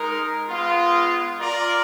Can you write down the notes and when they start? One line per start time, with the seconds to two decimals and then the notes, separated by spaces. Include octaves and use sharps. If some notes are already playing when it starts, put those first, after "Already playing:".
Already playing: G#3 D#4 A#4
0.49 G#3 B3 F4
1.38 F4 A#4 D5